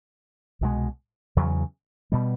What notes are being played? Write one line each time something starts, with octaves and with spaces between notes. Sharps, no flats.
C2 B2 G#3
E2 C#3 F#3
B2 G3